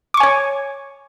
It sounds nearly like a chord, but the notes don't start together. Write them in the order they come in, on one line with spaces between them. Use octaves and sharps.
D6 C#6 G#5 C#5